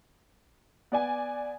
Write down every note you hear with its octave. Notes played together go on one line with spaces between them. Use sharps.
B3 D5 G#5